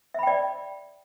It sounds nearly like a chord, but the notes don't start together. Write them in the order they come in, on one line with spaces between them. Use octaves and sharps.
E5 B5 G5 D5